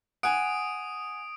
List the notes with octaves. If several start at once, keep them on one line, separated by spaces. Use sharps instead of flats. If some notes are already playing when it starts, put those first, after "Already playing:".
F#5 G#5 D#6 D7